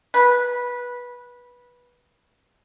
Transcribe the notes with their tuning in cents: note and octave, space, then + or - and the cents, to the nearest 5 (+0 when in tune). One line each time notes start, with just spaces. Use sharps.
B4 -15